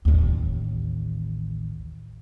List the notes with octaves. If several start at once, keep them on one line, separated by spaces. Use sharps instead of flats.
A1 D#2